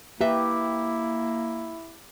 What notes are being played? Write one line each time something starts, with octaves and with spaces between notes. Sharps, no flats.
A#3 E4 G4 B4 E5